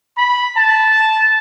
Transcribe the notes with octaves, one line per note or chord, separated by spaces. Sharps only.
B5
A5